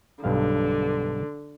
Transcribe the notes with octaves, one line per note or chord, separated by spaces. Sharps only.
B1 G2 D3 F5